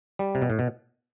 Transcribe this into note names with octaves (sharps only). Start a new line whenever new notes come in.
G3
C3
B2
A2
B2